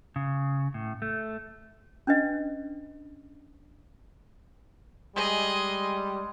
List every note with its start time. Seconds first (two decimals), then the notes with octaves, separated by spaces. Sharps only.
0.16 C#3
0.74 A2
1.02 A3
2.07 C#4 D4 B4 D#5
5.16 G3 G#3 G#4 D#5